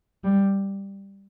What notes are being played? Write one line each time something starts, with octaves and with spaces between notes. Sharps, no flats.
G3